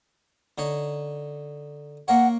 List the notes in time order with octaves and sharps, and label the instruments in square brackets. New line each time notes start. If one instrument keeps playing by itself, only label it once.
[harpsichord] D3 D#4 C#5
[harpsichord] A#3 A#4 C#5 [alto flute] F#5